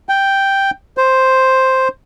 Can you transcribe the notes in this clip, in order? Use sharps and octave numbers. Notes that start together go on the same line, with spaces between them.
G5
C5